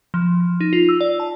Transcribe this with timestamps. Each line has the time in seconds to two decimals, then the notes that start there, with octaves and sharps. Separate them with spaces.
0.14 F3
0.60 D#4
0.73 F4
0.89 E6
1.01 D5
1.20 A5